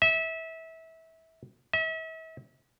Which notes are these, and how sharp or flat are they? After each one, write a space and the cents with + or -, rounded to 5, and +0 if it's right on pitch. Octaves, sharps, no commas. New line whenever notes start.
E5 -25
E5 -40